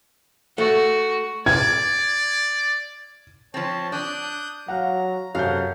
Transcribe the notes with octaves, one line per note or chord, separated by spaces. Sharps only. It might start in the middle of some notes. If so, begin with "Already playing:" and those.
A3 F#4
D5 G#6
F3 C4 C#5 A5
D4 D#6 F#6 G6
F#3 F5 F#5 A#5
F#2 C3 A4 F5 F#5 G6